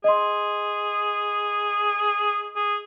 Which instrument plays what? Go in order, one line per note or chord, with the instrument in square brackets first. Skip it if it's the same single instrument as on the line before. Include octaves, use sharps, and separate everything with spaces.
[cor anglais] G#4 [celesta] D#5 C6
[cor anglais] G#4